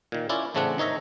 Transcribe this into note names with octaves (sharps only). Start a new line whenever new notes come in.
A#2 D#3
C#4 E4 F4 D5
A1 C#3 A3 C4 D4 F#5
D#3 D#4 C#5 E5 A#5